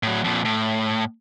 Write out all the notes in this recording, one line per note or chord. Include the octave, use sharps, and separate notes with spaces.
A2 F#3
F2 A#2
A2